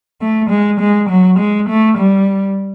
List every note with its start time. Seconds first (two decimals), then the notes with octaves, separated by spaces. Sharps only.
0.21 A3
0.50 G#3
0.80 G#3
1.09 F#3
1.39 G#3
1.68 A3
1.98 G3